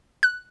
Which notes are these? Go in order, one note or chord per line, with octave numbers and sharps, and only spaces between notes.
F#6